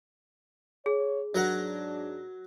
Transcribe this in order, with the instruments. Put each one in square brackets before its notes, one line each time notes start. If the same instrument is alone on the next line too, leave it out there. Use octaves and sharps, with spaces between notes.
[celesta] G#4 [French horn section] C#5
[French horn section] G#2 D4 [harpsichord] F#3 A#4 F#5